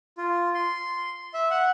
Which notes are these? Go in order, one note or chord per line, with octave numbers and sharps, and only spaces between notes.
F4
C6
E5
F#5